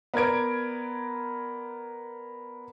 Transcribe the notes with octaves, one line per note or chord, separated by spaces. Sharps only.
B3 A#4 D5 G#6 D7